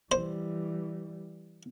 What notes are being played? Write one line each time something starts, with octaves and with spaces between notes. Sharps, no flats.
E3 G3 C5